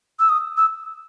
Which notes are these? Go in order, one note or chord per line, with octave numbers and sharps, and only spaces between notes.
E6
D#6
E6